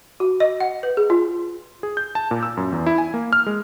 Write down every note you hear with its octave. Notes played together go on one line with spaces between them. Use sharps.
F#4
D#5
F#5
B4
G#4
F4
G#4
G6
A5
A#2
E6
F#2
E2
E4
G#5
A#3
F6
G#3